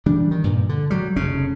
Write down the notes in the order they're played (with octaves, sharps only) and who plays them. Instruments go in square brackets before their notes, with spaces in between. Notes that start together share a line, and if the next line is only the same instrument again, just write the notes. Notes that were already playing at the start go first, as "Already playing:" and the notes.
[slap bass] E3 G3 D4
D#3
G2 A#2
D3
F#3 G3
F1 C#3 C#4